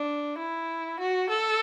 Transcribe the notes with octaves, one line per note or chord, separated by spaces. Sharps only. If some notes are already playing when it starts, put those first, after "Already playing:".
Already playing: D4
E4
F#4
A4